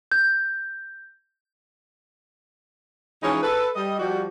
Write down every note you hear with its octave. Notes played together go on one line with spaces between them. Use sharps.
G6
E3 F3 G#3 C#4 D#4 C#5
A4 B4
G3 D#5
F3 G3 F#4